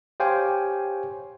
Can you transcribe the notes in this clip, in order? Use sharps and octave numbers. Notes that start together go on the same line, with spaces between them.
G4 C5 C#5 F5 G5 G#5